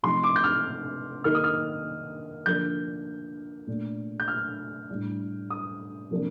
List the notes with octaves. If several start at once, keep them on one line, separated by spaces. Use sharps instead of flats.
C3 F3 A3 D#4 C6
D6
G6
F6
D#3 A#3 D#4 F6
D#6
F6
D3 F3 A#3 D4 G6
A#2 A3 D4
G6
F6
A2 G3 D4
D#6
C3 F3 A#3 D4